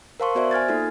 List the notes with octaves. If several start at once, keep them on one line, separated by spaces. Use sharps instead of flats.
A#4 C5 F5 A5 C6 C#6
B3 F#4 C5 D5 E5
G#5 F6 G#6 A6
A#3 D#4 F4 A4